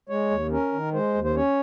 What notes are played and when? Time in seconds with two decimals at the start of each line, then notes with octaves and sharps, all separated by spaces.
0.09 G#3 C#5
0.31 D#2
0.51 C#4 A#4
0.72 D#3
0.93 G#3 C5
1.14 D#2
1.24 C5
1.35 C#4 C#5